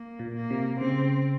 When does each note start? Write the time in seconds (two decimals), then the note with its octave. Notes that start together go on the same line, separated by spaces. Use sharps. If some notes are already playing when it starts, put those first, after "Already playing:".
Already playing: A#3
0.19 A#2
0.35 A#3
0.50 C3
0.81 C#3 C4